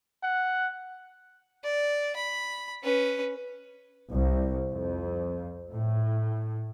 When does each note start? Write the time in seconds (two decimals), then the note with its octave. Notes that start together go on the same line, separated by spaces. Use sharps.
0.23 F#5
1.64 D5
2.16 B5
2.83 C#4 B4
4.10 C2
4.71 F2
5.72 A2